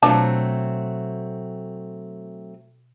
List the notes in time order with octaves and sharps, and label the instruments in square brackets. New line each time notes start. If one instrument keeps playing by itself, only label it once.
[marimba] B2 C5 [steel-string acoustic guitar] F#3 A3 C4 [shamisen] D4 F4 A5